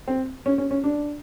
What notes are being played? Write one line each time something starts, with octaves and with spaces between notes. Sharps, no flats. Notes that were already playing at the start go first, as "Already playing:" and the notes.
C4
C#4
C#4
C#4
D4